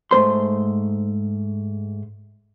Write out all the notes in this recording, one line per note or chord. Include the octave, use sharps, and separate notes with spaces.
G#2 A3 C5 C6